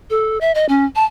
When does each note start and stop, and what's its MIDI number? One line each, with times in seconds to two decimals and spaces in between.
0.10 0.38 69
0.41 0.52 76
0.55 0.65 75
0.69 0.85 61
0.96 1.04 81